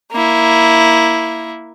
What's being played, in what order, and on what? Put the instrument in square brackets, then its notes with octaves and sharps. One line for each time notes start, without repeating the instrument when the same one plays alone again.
[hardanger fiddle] A#3 E4